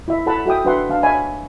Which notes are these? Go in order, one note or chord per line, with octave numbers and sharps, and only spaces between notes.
E4 E5
E4 A4 C#5 F#5 A5 B5
F#4 A4 E5 G5 D#6
D4 F#4 B4 E5 F#5 C6
D4 F5 A5
C#5 D#5 E5 G#5 B5